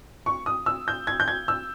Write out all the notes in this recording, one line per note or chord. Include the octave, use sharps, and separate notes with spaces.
C#6
D#6
E6
G6
G#6
G6
G#6
E6